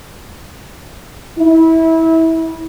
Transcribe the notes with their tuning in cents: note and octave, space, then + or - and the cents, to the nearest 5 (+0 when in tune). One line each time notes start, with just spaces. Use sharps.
E4 -25